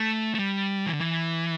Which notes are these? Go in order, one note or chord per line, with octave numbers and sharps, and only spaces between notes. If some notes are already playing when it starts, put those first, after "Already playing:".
Already playing: A3
A3
G3
E3
D3
E3